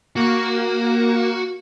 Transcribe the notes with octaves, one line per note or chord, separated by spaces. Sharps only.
A#3 F#4